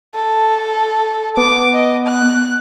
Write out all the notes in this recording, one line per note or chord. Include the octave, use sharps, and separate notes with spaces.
A4
B3 D6
D#5
F#6